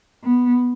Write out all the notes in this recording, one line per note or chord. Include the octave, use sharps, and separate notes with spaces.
B3